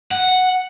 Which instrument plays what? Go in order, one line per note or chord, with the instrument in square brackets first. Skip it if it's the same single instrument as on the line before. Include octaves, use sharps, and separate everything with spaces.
[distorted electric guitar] F#5